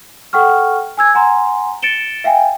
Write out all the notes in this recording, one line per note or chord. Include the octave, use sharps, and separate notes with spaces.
A4 F#5 G5 C#6 F6
G#5 E6 G#6
F#5 G#5 A#5 C6
A6 C#7 D7 E7 G7
E5 F5 G5 G#5